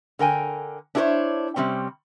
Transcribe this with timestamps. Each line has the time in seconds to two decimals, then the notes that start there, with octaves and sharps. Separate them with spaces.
0.19 D3 A#4 G5 G#5
0.95 D4 E4 G#4 A4 C5 C#5
1.56 C3 G3 C4 C#4